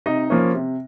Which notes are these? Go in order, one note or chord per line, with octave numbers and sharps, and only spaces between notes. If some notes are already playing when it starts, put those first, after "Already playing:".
C3 D#4 D#5
F3 A#3 C#4
C3